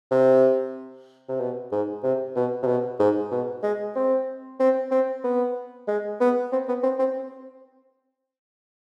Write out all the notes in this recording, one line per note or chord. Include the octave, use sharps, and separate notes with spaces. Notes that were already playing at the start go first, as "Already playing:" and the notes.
C3
C3
B2
G#2
C3
B2
C3
B2
G#2
B2
G#3
C4
C4
C4
B3
G#3
B3
C4
B3
C4
C4